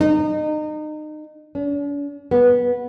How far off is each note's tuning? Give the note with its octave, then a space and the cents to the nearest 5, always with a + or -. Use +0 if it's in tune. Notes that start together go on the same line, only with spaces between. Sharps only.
D#4 -30
D4 -45
B3 -15